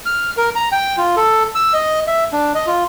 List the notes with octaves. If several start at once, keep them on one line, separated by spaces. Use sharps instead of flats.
F6
A#4
A#5
G5
F4
A4
E6
D#5
E5
D4
D#5
F4